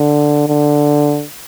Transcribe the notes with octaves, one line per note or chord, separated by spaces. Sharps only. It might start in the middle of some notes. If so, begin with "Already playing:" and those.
Already playing: D3
D3